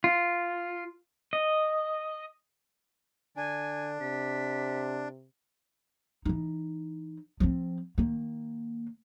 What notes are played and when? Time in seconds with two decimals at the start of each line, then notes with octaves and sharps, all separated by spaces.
0.04 F4
1.33 D#5
3.36 D3 D4 G#5
4.01 C3 B6
6.25 E3 D#4
7.40 F3 C4
7.98 D#3 A#3